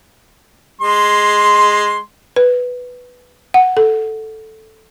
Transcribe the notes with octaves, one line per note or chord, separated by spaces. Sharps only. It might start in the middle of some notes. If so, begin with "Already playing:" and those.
G#3 C6
B4
F#5
A4